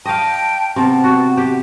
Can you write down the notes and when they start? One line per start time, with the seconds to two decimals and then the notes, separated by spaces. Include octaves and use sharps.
0.05 D#5 F5 G5 A5
0.76 C3 B3 A5
1.04 F#4
1.37 G4